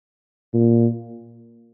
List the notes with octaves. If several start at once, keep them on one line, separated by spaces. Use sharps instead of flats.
A#2